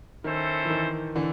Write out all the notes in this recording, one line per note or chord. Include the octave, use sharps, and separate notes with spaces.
D#3 C#4 E4 A4 C5
E3
D#3
D3 E3